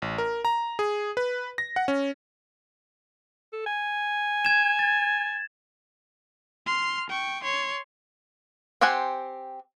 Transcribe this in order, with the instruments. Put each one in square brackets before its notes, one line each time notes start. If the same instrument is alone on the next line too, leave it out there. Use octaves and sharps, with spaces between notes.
[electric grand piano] A1
A#4
A#5
G#4
B4
A#6
F#5
C#4
[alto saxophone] A4
G#5
[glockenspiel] G#6 E7
A6
[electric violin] C6 F6
G5 C#6
C#5 C6
[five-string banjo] C4 G4 C5 F#5 G#5